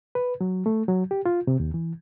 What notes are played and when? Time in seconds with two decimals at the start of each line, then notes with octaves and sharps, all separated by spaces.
0.15 B4
0.41 F#3
0.66 A3
0.88 F#3
1.11 G4
1.26 F4
1.47 C3
1.60 D#2
1.74 E3